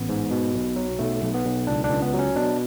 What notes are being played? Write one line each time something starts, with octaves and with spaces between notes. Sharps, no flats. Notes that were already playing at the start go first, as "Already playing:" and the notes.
Already playing: A1 B3
G#2
B2
B1
F#3
B1 A3
B1
B3
B1
C#2 D4
D4
C#2
B3
F#3
C#4
B2 D4